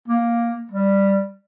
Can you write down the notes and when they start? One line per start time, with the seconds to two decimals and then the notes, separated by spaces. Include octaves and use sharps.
0.08 A#3
0.71 G3